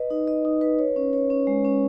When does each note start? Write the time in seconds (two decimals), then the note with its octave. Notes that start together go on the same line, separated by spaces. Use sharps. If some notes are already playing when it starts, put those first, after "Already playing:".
Already playing: B4 D#5
0.10 D#4
0.27 D#5
0.45 D#4
0.61 B4
0.79 C#5
0.96 C#4
1.13 C#5
1.30 C#4
1.47 G#3
1.65 C#4